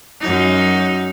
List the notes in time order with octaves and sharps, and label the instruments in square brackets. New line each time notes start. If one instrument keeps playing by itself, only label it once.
[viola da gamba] F#2 D#4